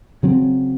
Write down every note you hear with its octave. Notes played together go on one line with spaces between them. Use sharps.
C#3 F#3 C4